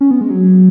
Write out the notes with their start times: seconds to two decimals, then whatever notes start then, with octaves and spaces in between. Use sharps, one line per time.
0.01 C#4
0.11 B3
0.21 G#3
0.30 F#3